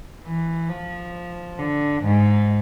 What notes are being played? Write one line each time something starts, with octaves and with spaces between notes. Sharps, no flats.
E3
F3
D3
G#2